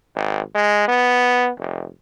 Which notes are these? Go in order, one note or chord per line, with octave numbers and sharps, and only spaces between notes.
G#1
G#3
B3
F1